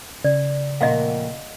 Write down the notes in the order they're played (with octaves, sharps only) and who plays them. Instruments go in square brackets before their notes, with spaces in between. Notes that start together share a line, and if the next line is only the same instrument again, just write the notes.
[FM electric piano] C#3 [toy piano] D5
[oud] F2 A#2 A#4 [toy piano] D#5 F5 F#5